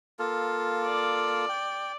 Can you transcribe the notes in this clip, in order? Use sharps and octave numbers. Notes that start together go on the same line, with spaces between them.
A#3 F4 A4
D5
G5